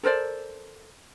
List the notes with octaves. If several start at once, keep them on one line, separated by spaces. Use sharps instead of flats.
A4 A#4 C5 D5